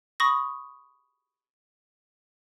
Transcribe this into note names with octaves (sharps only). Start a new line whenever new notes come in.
B5 C#6 D#6 A#6